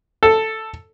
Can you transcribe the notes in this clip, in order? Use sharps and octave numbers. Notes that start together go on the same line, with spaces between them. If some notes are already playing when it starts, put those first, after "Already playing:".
A4